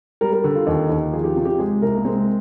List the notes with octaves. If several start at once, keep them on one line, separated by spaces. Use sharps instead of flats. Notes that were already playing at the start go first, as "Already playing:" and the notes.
G3 A#4
A#4
D3
F4
D#2 D#4
D#2
F3 G#4
G4
C3 F4
G4
G#3 G#4
C2 A#4
A#3
G#3 C4